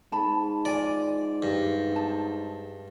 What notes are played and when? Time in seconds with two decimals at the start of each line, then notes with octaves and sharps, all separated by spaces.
0.12 G#2 A5 B5
0.65 F4 D5 G#5
1.42 G2
1.91 D#4 A5